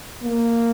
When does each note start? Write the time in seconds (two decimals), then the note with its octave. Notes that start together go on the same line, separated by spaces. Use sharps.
0.23 A#3